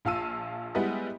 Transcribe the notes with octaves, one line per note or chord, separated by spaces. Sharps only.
A#1 F4 F5 A5 E6 D#7
G3 G#3 B3 E4 B4 D#5